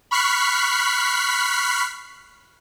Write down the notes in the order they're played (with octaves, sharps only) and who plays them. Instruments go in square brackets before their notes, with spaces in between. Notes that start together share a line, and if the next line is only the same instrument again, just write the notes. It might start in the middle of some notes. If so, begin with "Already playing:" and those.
[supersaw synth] B5 C#6 F6 F#6 B6 C7